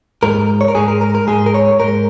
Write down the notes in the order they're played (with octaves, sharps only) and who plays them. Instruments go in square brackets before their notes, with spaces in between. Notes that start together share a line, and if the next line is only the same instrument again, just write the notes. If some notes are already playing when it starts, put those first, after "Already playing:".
[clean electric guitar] G#2 G#3 A#4
C#5
A#4
G#2 G#3 G#4
A#4
A#4
A#4
G#2 G#3 G#4
A#4
C#5
G#2 G#3 A#4